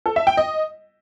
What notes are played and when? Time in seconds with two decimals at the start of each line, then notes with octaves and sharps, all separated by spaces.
0.06 A4
0.16 E5
0.27 G5
0.37 D#5